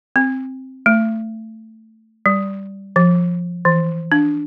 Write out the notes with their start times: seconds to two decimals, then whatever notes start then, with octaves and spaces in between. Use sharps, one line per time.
0.16 C4
0.86 A3
2.26 G3
2.96 F3
3.65 E3
4.12 D4